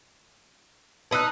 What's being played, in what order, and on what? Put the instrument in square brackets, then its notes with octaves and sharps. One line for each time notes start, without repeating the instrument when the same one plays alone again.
[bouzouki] D#4 B4 [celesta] A5 E6 F#6